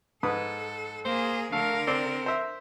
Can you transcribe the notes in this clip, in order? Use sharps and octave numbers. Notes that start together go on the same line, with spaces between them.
G#2 A4 B4 D#6
A#3 G#4 C5
D3 A3 A#4 F5
C4 D5
C5 E5